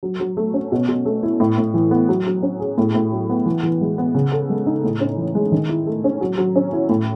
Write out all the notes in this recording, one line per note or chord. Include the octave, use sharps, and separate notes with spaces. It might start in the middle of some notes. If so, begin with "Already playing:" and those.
F#3
F#3
A3
C#4
B2
B2
A3
E4
A2
A2
E3
B3
F#3
F#3
C#4
G#4
A2
A2
F#3
B3
E3
E3
G#3
B3
C#3
A4
G#3
D#4
A2
C#4
E3
G#3
D#3
E4
A3
C#4
F#3
F#3
C#4
E4
A2